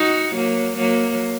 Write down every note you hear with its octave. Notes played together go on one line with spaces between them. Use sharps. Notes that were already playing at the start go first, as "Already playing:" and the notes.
Already playing: D#4 F#4
F#3 A#3
F#3 A#3